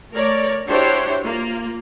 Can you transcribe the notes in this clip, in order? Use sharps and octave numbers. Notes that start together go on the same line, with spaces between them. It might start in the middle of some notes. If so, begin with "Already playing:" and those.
A3 A#4 C#5 D5
D4 E4 F#4 G4 C5 C#5
A#3 F4